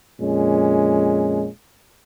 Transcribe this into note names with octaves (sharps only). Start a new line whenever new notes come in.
F2 A#2 G#3 C#4